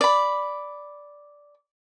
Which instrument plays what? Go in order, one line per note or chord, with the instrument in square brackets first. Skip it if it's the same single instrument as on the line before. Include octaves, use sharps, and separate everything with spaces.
[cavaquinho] D5 B5